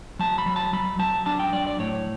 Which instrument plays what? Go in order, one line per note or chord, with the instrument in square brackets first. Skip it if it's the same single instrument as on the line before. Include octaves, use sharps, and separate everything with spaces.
[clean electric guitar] F#3 A5
B5
F#3
A5
F#3 B5
F#3 A5
D4 A5
G5
F#3 D5
D5
A2 C#5